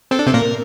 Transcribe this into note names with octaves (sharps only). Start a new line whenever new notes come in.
C4 A4
D4
C3 C4
A#2 A#3 A#4